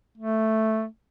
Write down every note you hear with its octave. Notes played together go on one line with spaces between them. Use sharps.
A3